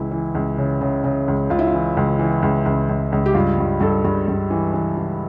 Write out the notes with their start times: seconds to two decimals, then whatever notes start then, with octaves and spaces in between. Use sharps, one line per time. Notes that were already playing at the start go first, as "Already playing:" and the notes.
Already playing: C#2 E3 E4
0.11 E3
0.35 C#2
0.58 C#3
0.81 C#3
1.04 C#3
1.28 C#2
1.50 C#2 F4
1.59 E4
1.67 F4
1.74 E3
1.97 C#2
2.19 E3
2.42 C#2
2.66 C#2
2.89 C#2
3.12 C#2
3.26 G4
3.34 G2 F4
3.59 G2
3.81 G2 A4
4.05 G2
4.28 G2
4.50 E3
4.74 E3
4.97 E3